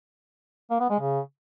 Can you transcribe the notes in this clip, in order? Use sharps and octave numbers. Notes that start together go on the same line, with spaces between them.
A#3
B3
G#3
C#3